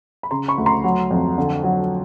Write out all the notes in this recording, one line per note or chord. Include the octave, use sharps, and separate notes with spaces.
B5
C#3 A#5 C6
B5 C#6
D2
A#5 C6
F#3
F2
D3
F#3